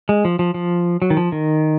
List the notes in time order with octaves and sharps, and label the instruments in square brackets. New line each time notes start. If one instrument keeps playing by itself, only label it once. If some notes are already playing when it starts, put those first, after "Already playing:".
[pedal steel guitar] G#3
F3
F3
F3
F#3
D#3
F3
D#3